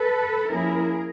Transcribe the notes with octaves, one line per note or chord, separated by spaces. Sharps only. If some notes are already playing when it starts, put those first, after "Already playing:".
Already playing: A4 B4
F3 A#3 C#4 E4 G#4 A#4